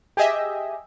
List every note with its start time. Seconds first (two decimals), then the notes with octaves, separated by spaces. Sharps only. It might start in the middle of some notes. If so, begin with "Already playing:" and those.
0.17 G4 G#4 D#5 E5